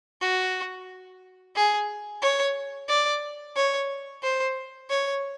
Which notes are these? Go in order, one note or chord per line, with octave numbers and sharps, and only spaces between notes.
F#4
G#4
C#5
D5
C#5
C5
C#5